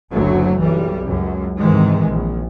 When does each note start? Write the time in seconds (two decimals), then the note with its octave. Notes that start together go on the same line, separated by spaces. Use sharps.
0.12 F#1 D2 F#3 A3
0.61 B1 E3 G3
1.07 C#2 F#2
1.59 G#2 C3 D#3 E3 G#3
2.08 A#1